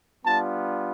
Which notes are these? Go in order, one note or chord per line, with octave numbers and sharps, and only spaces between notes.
G3 B3 D4 F4 A5